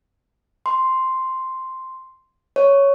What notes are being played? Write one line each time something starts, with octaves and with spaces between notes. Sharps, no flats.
C6
C#5